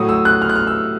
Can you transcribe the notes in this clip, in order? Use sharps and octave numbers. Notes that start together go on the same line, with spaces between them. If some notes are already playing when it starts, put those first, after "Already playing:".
Already playing: A2 F#3 D#6
E6
F#6
F6
F#6
F6
E6